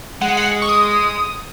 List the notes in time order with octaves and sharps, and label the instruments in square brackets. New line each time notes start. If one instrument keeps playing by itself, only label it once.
[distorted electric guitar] G#3 [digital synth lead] F#5
[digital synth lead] F#5
C#6
D#6